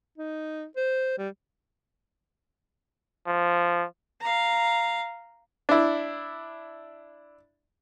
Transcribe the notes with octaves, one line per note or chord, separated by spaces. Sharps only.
D#4
C5
G3
F3
F5 A#5
D4 E4